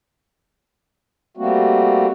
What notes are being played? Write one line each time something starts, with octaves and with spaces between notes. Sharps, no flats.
G3 A3 A#3 C4 F#4